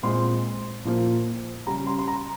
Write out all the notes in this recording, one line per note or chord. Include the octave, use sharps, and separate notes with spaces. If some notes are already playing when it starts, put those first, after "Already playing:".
A#2 G#3 C4 C6
A#2 F3 A#3
C#3 G3 C#4 A#5
C6
C6
A#5